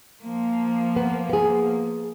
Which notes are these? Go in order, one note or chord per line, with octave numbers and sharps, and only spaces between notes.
F3 A#3
B3
B3 G#4